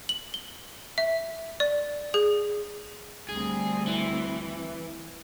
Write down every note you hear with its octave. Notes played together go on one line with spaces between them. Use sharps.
F#7
G7
E5
D5
G#4
D2 G3 C4 G#4
E3